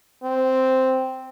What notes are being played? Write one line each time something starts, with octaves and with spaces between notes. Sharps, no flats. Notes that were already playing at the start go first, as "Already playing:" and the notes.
C4